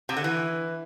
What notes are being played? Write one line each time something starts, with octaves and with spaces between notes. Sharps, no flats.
C3
D3
E3